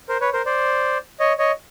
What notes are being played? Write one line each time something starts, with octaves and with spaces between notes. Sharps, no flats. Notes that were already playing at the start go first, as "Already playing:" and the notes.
A#4 C5
B4 C#5
A#4 C5
C5 D5
C#5 D#5
C#5 D#5